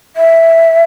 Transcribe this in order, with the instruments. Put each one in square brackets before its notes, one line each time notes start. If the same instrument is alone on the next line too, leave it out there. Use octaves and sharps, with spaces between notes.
[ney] E5